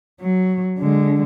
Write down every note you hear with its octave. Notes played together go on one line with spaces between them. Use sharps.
F#3
D3 G#3